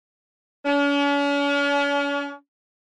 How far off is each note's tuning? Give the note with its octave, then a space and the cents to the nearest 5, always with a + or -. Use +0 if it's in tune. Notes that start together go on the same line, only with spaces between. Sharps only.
C#4 +45